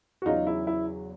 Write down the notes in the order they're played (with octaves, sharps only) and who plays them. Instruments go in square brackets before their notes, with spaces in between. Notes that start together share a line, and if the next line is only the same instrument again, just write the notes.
[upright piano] F#4
E2 C#3 F#3 D#4 F4
E4
E4